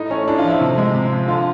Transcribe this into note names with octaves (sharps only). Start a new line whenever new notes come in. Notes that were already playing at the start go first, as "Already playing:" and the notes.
Already playing: A2 D#4
A3 C#4
A2 D4
F4
F3
E4
C3
G#3
C3
F3
D3 F4